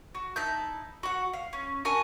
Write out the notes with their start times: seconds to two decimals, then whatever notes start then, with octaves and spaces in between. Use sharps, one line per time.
0.15 F#4
0.36 D#4 E4 A5 G6
1.03 F#4 F#5
1.33 F5
1.53 C#4
1.85 F#4 A#4 G#5 A5